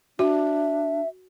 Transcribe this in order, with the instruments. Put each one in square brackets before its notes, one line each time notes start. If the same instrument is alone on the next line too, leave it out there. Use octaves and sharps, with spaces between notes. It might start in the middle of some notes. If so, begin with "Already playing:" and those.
[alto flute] D4 [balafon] F#4 [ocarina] E5